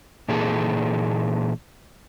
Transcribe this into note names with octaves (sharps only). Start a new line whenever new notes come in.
A#2 E3 A#3 D#4 G#4 A4